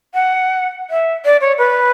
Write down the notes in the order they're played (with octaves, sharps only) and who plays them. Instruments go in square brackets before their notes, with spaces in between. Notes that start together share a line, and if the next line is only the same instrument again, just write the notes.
[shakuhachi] F#5
E5
D5
C#5
B4